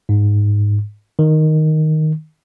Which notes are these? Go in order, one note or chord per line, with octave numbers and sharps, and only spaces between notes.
G#2
D#3